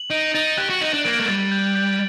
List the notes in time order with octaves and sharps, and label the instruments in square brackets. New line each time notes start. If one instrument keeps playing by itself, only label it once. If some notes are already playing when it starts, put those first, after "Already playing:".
Already playing: [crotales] F#7
[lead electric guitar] D#4 [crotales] D7
[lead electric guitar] D#4 [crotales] A6
[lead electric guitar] G4 [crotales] F#6
[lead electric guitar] F#4
[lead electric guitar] D#4 [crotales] F#7
[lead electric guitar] D4
[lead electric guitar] A#3 [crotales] D7
[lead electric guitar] A3
[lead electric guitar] G3 [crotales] A6
[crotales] G6
G6